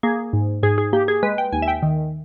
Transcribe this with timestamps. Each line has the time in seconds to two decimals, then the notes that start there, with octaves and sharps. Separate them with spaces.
0.03 A#3 G#4
0.33 G#2
0.63 G#2 G#4
0.78 G#4
0.93 A#3 G4
1.08 G#4
1.23 G#3 B4
1.38 G5
1.52 D#2 G#5
1.62 E5
1.68 G5
1.83 D#3